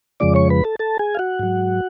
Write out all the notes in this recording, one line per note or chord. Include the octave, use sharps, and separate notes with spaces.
F2 C#3 F3 G#3 D5 D6
C#5 C#6
B4 B5
A4 A5
A4 A5
G#4 G#5
F5
F#4 F#5
G#2 F#3